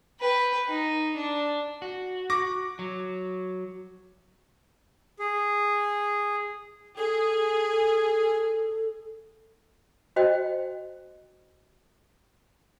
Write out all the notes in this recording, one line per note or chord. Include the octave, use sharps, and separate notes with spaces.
B4 G5
D#4
D4
F#4
C#6 D6 A#6
F#3
G#4
G#4 A4
F#4 C5 D#5 G5